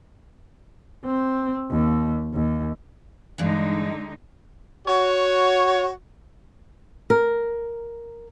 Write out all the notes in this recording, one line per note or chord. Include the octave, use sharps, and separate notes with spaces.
C4
D#2
D#2
G2 D3 E3 G#3 D#4
F#4 C#5
A#4